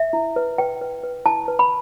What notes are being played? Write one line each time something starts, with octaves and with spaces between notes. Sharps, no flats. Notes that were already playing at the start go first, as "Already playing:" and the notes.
Already playing: E5
E4
B4
B4 G5
B4
B4
E4 A5
B4
B5